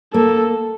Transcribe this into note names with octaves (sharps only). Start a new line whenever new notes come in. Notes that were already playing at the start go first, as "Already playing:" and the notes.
A#3 A4